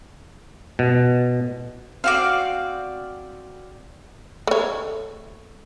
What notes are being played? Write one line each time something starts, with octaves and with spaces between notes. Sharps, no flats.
B2
C4 F#4 D5 F5
A3 C#5